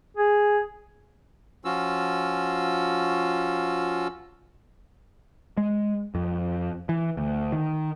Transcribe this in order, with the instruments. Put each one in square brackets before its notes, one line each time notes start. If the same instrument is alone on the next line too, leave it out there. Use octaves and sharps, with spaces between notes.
[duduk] G#4
[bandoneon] F3 C#4 F4 F#4 E6
[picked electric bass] G#3
F2
E3
D2
D#3